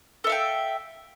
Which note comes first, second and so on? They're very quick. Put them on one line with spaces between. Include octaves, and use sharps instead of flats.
A4 E5 F5 G5